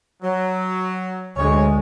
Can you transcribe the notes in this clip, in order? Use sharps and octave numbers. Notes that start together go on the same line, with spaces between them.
F#3
D2 G#3 C#5